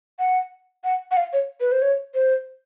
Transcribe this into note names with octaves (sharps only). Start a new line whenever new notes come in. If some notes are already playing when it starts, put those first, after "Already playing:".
F#5
F#5
F#5
F5
C#5
B4
C5
C#5
C5